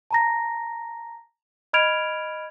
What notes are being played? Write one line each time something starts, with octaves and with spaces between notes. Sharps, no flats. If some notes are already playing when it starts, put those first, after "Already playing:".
A5 A#5 A#6
D#5 B5 F6 G#6 D7 F7